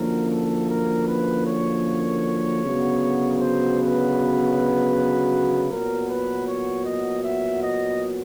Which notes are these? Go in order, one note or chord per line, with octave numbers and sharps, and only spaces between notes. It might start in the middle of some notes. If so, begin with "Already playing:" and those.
Already playing: F#2 D3 F3 A#3 C#4 A#4
A4
A#4
B4
C#5
D2 C#3 F#3 B3
C5
B4
A#2 F#3 B3 A#4
B4
C#5
D#5
E5
D#5